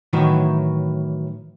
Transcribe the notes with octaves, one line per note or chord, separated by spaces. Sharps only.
A2 D#3 E3 F#3